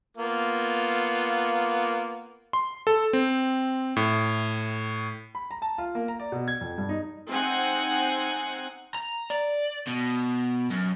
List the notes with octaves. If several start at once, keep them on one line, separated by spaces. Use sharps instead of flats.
A#3 B3 F4
C6
A4
C4
A2
B5
A#5
A5
F4
A#3
A#5
D5
B2
G#6
F2
G2
D#4
C4 D#4 F#5 G#5
A#5
D5
B2
F#2